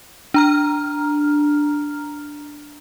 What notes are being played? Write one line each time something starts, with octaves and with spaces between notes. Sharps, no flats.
D4 A#5 F6